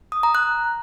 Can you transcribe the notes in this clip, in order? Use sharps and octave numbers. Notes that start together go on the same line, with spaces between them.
D#6
A#5
F#6